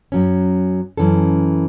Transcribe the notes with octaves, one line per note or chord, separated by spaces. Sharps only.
F#2 F#3 C#4
F#2 E3 C#4 A4